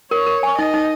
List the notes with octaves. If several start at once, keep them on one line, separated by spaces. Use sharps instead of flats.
A#4 C#5
A#4
G#5
D#4 D#5
D#4